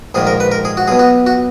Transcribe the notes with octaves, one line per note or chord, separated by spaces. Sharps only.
A#1 G#2 D#3 G#4
A#4
B4
A#4
G#4
F#4
B1 B2 G#4
F#4
F#4